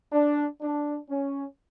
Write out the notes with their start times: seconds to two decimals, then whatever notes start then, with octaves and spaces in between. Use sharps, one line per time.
0.13 D4
0.61 D4
1.09 C#4